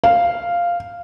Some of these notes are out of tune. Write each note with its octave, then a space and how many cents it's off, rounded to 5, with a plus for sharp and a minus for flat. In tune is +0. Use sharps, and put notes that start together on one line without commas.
F5 -5